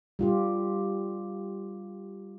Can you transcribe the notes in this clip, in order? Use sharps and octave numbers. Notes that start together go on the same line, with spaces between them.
G3 F4 G4